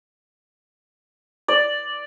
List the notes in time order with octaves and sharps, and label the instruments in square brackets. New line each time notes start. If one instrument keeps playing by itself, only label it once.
[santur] D5